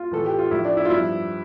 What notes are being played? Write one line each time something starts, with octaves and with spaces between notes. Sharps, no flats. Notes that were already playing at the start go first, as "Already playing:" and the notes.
Already playing: F4
A2 E3 A4
G4
F4
A2 F3 E4
D4
E4
F4
G2 F3 E4